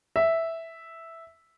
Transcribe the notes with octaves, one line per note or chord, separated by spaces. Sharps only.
E5